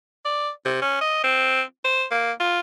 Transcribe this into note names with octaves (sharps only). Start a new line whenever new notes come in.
D5
C3
C#4
D#5
C4
C5
A#3
F4